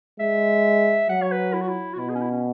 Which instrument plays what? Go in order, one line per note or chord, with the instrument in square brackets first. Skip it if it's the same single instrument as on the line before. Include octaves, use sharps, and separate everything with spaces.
[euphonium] G#3 [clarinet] E5
[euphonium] F#3 [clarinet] F#5
[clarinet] C#5
B4
E4
F#4
E4
F#4
[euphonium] B2 [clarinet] E4
[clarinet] G#4
C#4
E4
C#4